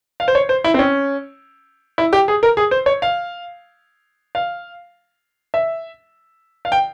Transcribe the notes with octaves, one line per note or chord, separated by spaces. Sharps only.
F5
C5
C#5
C5
E4
C4
C#4
E4
G4
G#4
A#4
G#4
C5
C#5
F5
F5
E5
F5
G5